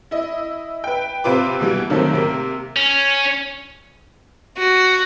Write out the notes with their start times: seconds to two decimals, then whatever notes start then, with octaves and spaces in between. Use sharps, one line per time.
0.11 E4 D#5
0.84 B4 G5
1.24 C3 C4 F4 B4 D6
1.60 B2 E3 G3
1.89 C3 D#3 F#3 A3 A#3 C4
2.13 C3 A#3
2.76 C#4
4.58 F#4